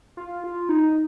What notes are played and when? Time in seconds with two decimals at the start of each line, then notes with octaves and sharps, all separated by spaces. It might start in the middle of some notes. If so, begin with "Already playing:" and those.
0.17 F4
0.44 F4
0.69 D#4